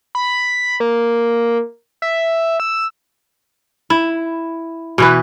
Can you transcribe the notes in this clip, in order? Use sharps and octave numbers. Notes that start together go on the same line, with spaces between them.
B5
A#3
E5
E6
E4
B2 E3 B4